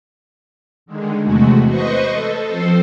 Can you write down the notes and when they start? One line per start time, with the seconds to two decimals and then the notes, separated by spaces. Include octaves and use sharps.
0.86 D3 D#3 G#3
1.21 E2 C3 G#3 A3 F#4
1.68 B4 C5 D#5 C#6
2.10 A4
2.45 F3 C4 A4 C5